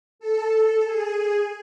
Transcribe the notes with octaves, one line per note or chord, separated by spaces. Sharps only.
A4
G#4